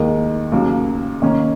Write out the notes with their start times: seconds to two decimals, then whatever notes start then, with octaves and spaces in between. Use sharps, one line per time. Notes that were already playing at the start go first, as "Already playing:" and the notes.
Already playing: D#2 D#3 G#3
0.52 D#2 C#3 F#3 A#3
1.22 D#3 A#3 C#4